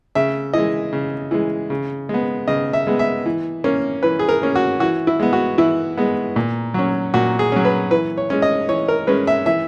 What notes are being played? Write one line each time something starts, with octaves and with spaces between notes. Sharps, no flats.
C#3 E5
E3 G#3 D#5
C#3
E3 G#3
C#3
G#3 B3
C#3 D#5
E5
G#3 B3
E5
E3
A#3 C#4
E3 B4
G#4
A#4
A#3 C#4
F#4
E3 F#4
E4
G#3 B3
F#4
E3 E4
G#3 B3
A#2
F#3 C#4
A#2 F#4
G#4
F#3 C#4
B4
E3 B4
C#5
G#3 C#4
D#5
E3 C#5
A#4
G#3 C#4 B4
E5
E3 E5